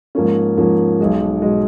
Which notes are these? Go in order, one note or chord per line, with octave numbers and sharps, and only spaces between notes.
G#2 F3 A#3 C#4
G#2 F3 A#3 C#4
B1 B2 G#3
B2 G#3